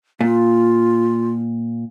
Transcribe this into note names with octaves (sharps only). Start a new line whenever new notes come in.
A#2 F4